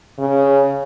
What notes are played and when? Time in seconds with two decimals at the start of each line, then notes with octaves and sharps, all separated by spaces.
0.19 C#3